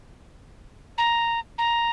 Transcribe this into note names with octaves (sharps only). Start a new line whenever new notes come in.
A#5
A#5